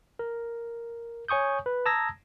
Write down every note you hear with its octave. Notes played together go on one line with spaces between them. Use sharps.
A#4
C#5 G#5 C#6 D#6 G6
B4
A5 A#5 D#6 E6 G#6 A#6